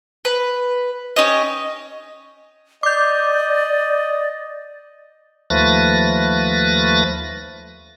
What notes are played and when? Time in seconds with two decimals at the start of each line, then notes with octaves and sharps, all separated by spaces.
0.25 B4
1.16 C#4 G4 D#5
2.83 D5 D#5 D6 G6
5.50 D#2 F3 A3 B4 A6 A#6